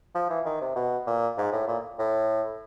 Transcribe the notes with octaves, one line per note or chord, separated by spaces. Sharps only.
F3
E3
D#3
C3
B2
A#2
G#2
A2
A#2
A2